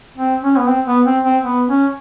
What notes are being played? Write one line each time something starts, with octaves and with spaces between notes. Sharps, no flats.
C4
C#4
B3
C4
B3
C4
C4
B3
C#4